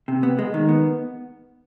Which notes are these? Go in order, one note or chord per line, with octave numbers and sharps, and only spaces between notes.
C3
B3
G#3
D#3
B3